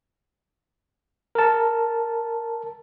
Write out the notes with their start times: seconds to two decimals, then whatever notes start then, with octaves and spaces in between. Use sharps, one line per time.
1.35 A#4 A5